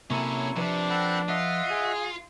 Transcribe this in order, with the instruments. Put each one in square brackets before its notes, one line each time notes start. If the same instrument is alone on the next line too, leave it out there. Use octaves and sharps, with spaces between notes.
[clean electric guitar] C3 A#3 [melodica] F#3 E4 C#6 [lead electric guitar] C#4 A4
[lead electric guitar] C3 [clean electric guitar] F3 B4 [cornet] D4
[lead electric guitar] C4 [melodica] A4 F#5 B5
[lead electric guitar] F4 [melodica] D#5 E5 F#5
[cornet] G#4